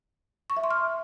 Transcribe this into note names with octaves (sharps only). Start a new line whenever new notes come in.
C#6
E5
C6
F6